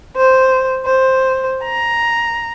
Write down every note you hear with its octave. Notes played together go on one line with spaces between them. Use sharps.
C5
C5
A#5